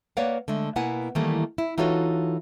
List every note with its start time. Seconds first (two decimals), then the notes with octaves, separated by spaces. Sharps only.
0.17 A#3 B4 C#5 D5 F5 F#5
0.48 D3 G#3 A3
0.76 B2 A#3 B3 E4 F#5 G#5
1.15 D#3 E3 G3 A3 A#3
1.58 E4
1.78 E3 D#4 F4 F#4 A4 C#5